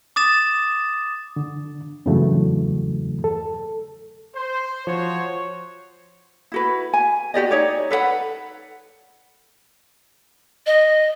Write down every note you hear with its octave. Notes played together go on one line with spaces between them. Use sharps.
D6 D#6 A6 E7
D3
E2 G2 C#3 E3 F#3 A3
A4
C5
F3 F#4 C5 C#5
E4 F#4 B4
G#5
F#4 G4 D5 D#5
D#4 C#5 D5
A4 B4 C#5 F#5
D#5